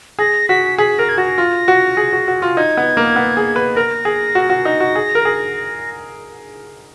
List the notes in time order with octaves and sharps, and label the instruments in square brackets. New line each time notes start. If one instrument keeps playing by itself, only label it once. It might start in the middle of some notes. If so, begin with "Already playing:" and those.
[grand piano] G#4 [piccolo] A#6
[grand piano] F#4 [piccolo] B6
[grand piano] G#4 [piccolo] B6
[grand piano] A#4 [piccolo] A#6
[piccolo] G#6
[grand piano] F#4 [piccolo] A#6
[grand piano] F4
F#4
G#4
F#4
F#4
F4
[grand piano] D#4 [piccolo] G#6
[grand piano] B3
A#3
B3
G#4
B4
[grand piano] A#4 [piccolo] A#6
[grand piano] G#4
F#4
F#4
D#4
F#4
G#4
A#4
G#4